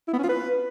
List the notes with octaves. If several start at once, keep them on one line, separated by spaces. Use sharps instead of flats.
E4
B3
C#4
F4
B4